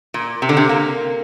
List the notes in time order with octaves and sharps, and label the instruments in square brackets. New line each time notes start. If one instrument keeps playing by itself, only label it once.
[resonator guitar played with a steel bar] A#2
C3
D3
C3
A#3